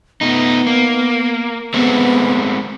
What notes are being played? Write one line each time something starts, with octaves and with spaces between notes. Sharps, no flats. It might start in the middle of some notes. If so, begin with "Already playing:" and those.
A3 B3 D#4
A#3
G#3 A3 B3 C4